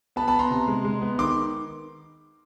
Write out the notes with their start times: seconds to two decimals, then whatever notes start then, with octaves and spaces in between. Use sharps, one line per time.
0.16 B3 A5 B5
0.28 A5 B5
0.34 B3
0.39 A#5 C6
0.50 C3
0.68 G#3
0.84 G#3
1.01 B3
1.18 D#3 C6 D6